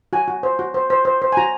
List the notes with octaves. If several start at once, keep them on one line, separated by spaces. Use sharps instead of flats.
F#4 G#5
F#4
C5
F#4
C5
C5
C5
C5
G#5
F#4 A#5